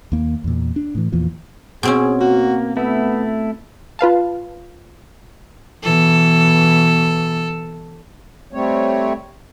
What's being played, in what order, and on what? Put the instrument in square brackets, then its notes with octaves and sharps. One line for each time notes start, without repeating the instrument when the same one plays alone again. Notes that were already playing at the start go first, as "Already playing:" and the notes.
[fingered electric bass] D#2 A#3
E2 A#2
D4
A2 E3
E2 A#2 E3 F3
[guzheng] B2 C4 C#4 [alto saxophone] G#4
[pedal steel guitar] A#3 [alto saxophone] F#4
[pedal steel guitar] A3 E4 [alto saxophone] B3
[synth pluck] F4 B4 F5 A5
[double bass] B2 E3 [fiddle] A4
[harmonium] G3 A3 C4 C#5